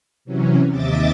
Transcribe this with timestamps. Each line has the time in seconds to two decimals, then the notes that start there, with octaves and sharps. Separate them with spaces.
0.25 C3 E3 F#3 C#4
0.69 D#2 C3 D#5 E5 D6 A6